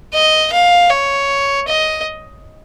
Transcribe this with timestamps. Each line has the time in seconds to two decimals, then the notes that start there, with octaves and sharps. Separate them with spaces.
0.13 D#5
0.52 F5
0.90 C#5
1.68 D#5